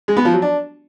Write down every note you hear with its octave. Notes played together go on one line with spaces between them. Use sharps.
G#3
B3
F3
F#3
D4